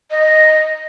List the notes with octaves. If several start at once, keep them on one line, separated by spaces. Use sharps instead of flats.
D#5